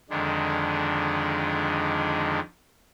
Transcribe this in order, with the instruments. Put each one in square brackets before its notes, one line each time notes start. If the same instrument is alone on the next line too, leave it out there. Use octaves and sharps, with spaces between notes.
[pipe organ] F2 D3 D#3 G#3 D4